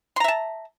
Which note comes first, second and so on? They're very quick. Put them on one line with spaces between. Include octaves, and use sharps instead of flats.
C6 A#5 E5 A5